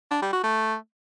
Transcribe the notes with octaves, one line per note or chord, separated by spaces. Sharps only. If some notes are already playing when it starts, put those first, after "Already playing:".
D4
G3
F#4
A3